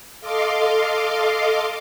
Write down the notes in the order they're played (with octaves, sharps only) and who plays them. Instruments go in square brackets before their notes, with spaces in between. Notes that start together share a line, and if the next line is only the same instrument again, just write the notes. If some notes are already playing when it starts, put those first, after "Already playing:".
[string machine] A4 D#5 F5 C6 D6